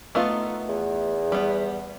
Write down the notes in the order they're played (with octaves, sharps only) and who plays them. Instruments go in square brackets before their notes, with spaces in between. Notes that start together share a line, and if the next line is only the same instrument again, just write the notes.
[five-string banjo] A3 B3 F4 [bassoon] D#4
[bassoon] E2
[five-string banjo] G3 B3